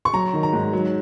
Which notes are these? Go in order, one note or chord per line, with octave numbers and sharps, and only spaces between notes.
C#6
F#3 A#5
D#3
A#5
G#2
F#3